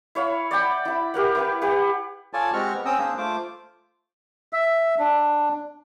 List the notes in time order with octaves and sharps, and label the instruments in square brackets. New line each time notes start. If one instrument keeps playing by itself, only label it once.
[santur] E4 C#5 F5 B5
D5 F#5 G5 B5
E4 B5
G4 A#4 F#5
E4 B4 G5
G4 B4 F#5
[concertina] F4 A4 C#5 D5 G#5 A5
G#3 C4 F#4 G4 C#6 F6
B3
C4 C#4 G5 A#5 D#6 E6
A#3 D4 G#4 C5
A3 F4 C5 D6
[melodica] E5
D4